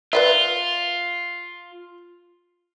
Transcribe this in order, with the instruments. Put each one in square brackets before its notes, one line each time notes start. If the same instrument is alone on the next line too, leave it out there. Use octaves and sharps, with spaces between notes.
[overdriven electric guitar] F4 [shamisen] B4 D5 E5